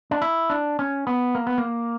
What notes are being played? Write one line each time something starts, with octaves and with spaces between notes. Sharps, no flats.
D4
E4
D4
C#4
B3
A#3
B3
A#3